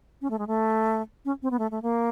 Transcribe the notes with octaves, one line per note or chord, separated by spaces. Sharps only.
C#4
A3
G#3
A3
C#4
C4
B3
A3
A3
A#3